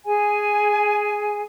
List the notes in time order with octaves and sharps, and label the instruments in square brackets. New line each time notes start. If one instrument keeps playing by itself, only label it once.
[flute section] G#4 G#5